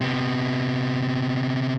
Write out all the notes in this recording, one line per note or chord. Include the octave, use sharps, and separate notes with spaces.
C3 B3